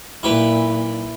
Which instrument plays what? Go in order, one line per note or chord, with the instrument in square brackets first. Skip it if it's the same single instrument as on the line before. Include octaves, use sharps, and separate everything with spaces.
[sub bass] B1 [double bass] A#2 [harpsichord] E4 G4 B4